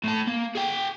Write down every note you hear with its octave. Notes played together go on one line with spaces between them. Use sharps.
A2 A5
A#3
G#4 G5